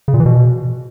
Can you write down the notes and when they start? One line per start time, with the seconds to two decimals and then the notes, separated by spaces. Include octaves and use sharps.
0.08 C#3
0.14 A#2
0.20 E3
0.26 B2